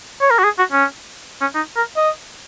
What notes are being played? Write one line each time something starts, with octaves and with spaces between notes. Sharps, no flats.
C#5
A#4
F#4
G#4
F#4
C#4
C#4
D#4
A#4
D#5